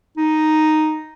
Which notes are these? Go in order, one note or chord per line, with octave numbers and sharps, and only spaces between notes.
D#4